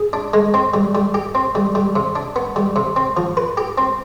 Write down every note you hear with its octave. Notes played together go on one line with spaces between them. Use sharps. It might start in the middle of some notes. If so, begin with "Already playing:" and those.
Already playing: G#4
D4
G#3
C4
G3
G3
G4
C4
G3
G3
C3
D4
B3
G3
C3
C4
F3
B4
G4
C4